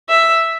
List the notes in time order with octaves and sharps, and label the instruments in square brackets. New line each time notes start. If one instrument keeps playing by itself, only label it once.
[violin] E5